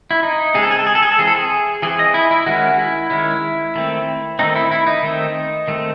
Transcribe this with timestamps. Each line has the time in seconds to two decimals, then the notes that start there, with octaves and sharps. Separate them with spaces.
0.11 E4
0.23 D#4
0.54 C#3 G#3 C4 G#4
0.63 A4
0.71 G#4
0.79 A4
0.87 G#4
0.95 A4
1.02 G#4
1.12 A4
1.19 E3 C4 G#4
1.27 A4
1.36 G#4
1.82 E3 C4 G#4
1.99 D#5
2.14 E4
2.31 E4
2.46 D#3 G#3 C#4 F#4
2.79 E4
3.10 D#3 G#3 C#4 E4
3.75 D#3 A3 C4
4.39 D#3 A3 C4 D#4
4.56 E4
4.71 E4
4.87 D#4
5.03 D#3 A3 C4
5.68 D#3 A3 C4